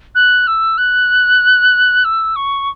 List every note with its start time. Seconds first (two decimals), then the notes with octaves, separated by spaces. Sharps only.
0.15 F#6
0.47 E6
0.78 F#6
2.04 E6
2.36 C#6